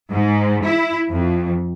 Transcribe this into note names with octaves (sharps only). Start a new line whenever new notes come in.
G#2
E4
F2